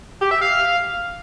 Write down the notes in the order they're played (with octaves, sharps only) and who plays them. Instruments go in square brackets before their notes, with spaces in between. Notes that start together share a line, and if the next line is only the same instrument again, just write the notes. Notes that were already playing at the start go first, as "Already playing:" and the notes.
[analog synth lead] G4
E5
F5